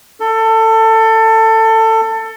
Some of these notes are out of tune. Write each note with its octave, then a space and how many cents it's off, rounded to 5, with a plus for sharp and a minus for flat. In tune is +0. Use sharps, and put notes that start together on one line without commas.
A4 +20